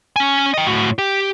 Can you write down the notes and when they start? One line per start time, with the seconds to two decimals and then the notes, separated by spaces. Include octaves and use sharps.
0.16 C#4 G#5
0.54 D#5 G5
0.67 A2 F#4
0.98 G4